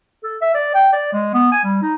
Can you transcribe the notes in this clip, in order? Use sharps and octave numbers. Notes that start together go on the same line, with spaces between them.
A4
E5
D5
G5
D5
G#3
B3
G#5
G3
D#4